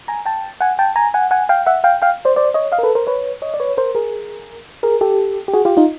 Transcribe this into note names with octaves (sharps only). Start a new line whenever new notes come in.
G#5 A#5
G5 A5
F#5 G#5
G5 A5
G#5 A#5
F#5 G#5
F#5 G#5
F5 G5
E5 F#5
F5 G5
F5 G5
C5 D5
C5 D5
C#5 D#5
D#5 F5
A#4
A4 B4
A#4 C5
B4 C#5
C#5 D#5
D5
B4 C#5
A#4 C5
G#4 A#4
G#4 A#4
G4 A4
G4
F#4 G#4
F4 G4
D#4 F4